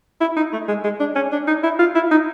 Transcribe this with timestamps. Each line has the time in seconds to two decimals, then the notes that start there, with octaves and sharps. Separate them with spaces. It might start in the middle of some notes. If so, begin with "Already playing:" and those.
0.20 E4
0.36 D#4
0.53 A3
0.68 G#3
0.84 G#3
1.00 D4
1.15 C#4
1.32 D4
1.47 D#4
1.63 E4
1.79 F4
1.95 E4
2.11 D#4